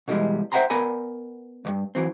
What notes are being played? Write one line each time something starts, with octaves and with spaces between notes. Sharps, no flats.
B2 D3 E3 G3 G#3
C5 E5 F#5 G5 A#5 C6
B3 A#4 D5 G#5 B5
D2 G2
E3 F#3 C4